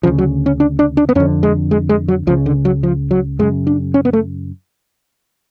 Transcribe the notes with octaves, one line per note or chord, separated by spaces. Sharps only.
D2 C#3 F3
F#3
C#4
D4
D4
D4
B3
F2 D3 C#4
G#3
G#3
G#3
F#3
C#2 C#3 F3
D3
F#3
F3
F#3
F#2 C#3 G#3
D4
C#4
B3
A3